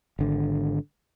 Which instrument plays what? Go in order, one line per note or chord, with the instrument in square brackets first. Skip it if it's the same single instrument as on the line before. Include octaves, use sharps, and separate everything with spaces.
[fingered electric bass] G#1 D3